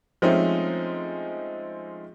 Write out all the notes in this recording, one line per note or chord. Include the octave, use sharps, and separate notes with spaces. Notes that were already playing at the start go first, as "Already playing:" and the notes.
F3 G#3 A3 C4 C#4 D#4